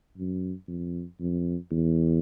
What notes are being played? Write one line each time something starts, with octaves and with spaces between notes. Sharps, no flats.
F#2
F2
F2
E2